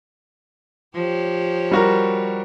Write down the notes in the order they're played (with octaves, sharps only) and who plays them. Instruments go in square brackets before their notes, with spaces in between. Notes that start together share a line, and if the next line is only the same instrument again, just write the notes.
[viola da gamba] F3 G4 C#5
[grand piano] G3 F#4 A#4